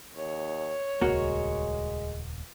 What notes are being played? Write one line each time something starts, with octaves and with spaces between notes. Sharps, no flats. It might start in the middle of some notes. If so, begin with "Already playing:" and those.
D#2 C#5
D#1 C#2 G#3 A#3 F#4